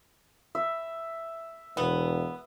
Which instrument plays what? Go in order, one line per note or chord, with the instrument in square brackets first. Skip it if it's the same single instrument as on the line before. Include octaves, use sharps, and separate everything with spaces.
[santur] E5
[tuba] E1 [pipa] B3